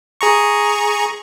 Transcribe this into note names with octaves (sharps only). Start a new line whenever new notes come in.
G#4 A#5 C#6